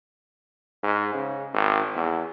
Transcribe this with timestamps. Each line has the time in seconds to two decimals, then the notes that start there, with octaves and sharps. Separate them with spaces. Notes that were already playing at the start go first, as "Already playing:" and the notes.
0.83 G#2
1.14 C#3
1.53 G#1
1.94 E2